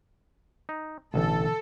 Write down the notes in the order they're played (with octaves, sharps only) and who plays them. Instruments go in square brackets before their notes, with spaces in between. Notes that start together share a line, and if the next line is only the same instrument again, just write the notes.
[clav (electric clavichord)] D#4
[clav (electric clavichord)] A1 [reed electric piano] B2 D3 E3 [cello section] A4